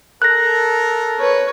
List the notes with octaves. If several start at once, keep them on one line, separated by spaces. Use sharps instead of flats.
A4 A#4 F#6 A#6
B4 C#5